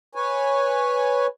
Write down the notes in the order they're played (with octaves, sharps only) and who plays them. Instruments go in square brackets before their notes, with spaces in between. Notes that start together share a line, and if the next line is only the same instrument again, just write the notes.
[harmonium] B4 C#5 G#5